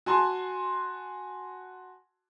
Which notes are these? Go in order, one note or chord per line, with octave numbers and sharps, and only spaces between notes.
F#4 G#5 A5 C6